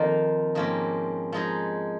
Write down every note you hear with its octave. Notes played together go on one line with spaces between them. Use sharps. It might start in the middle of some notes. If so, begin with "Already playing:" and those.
Already playing: F2 D#3 A#3 F4
G#2 F3 A#3 C#4 G4
F3 G#3 D#4 G#4